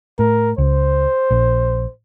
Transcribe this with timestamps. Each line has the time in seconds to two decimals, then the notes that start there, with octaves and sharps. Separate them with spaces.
0.19 A2 A#4
0.58 C#2 C5
1.31 A#1